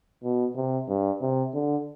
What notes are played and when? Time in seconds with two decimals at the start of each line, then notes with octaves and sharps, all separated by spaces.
0.24 B2
0.56 C3
0.88 G2
1.21 C3
1.54 D3